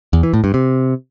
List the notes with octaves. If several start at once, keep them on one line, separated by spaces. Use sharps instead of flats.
E2
E3
A2
G2
C3